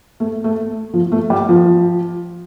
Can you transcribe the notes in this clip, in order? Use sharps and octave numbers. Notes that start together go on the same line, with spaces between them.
A3
A3
F3
A3
G3
F3